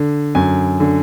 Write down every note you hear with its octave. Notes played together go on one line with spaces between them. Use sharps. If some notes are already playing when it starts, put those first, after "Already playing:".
Already playing: D3
F#2 G#5
D3